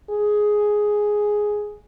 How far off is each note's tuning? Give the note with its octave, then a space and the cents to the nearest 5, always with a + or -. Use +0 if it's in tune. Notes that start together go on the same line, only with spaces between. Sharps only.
G#4 +5